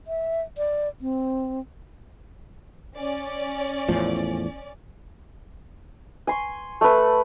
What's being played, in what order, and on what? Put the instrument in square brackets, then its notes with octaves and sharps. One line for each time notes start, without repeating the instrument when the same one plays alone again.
[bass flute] E5
D5
C4
[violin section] C#4 D5
[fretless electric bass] E2 A2 F3
[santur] G#5 C6 C#6
A3 B4